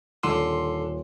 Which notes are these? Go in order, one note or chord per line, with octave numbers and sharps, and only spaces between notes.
D#1 D3 C6